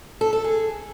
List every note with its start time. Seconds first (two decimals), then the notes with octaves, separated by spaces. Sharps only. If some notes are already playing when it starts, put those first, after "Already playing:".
0.21 A4
0.33 A4
0.44 G#4